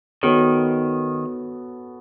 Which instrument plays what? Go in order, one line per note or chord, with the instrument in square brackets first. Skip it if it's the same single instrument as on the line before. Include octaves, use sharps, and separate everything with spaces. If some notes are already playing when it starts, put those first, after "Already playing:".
[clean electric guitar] D#3 [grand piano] B3 F#4 A4 C#5